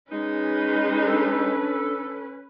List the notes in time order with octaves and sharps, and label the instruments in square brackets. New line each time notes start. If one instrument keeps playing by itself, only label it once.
[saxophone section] G#3 D#4 [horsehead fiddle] C#4 B4
[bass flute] D4 [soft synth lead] A4